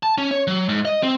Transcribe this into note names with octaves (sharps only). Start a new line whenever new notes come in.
A5
C#4
C#5
F#3
G#2
D#5
C4